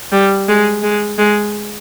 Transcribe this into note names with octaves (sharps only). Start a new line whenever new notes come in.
G3
G#3
G#3
G#3